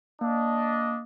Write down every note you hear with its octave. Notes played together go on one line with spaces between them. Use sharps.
A#3 D4 D#5